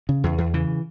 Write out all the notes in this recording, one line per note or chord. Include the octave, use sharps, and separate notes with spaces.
C#3
E2
E2
C#3 E3